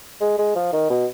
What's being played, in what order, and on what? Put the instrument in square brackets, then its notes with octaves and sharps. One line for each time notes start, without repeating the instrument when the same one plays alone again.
[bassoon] G#3
G#3
F3
D#3
B2